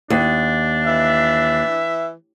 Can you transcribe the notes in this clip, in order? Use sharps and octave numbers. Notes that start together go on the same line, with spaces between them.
D#2 D4
E3 E5